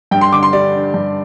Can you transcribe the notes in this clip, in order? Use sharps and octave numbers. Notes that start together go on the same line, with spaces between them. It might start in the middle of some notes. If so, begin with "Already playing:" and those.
G2 G5
C6
D3 D6
C6
G3 D5
D4
G2